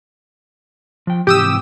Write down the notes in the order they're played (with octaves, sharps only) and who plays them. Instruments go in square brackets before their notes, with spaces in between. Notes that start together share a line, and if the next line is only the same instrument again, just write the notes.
[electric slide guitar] F3 G5
[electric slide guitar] G#2 C3 E3 [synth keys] G4 D#6 E6